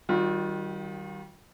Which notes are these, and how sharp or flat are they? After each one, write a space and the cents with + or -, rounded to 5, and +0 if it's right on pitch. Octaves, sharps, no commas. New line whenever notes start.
D#3 +5 G3 -25 F4 +40